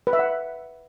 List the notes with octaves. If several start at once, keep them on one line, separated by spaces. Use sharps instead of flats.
B4
E5
F#5